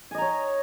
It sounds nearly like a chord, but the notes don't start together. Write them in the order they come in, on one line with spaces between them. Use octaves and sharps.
G#5 D#5 A#5 C#5